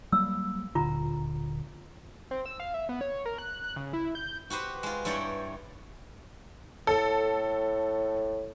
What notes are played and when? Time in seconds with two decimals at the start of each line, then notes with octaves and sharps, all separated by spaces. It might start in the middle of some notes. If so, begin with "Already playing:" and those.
0.12 F#3 G3 A#3 E6
0.75 D1 A#2 D3 F4 A#5
2.31 C4
2.46 E6
2.60 F5
2.74 E5
2.89 B3
3.01 C#5
3.26 A#4
3.38 F#6
3.64 F#6
3.76 C#3
3.93 E4
4.15 G6
4.50 F#4 G4 B4 C5
4.83 G#3 F4
5.05 G2 G3 E4 C#5 D5 G5
6.87 A2 A4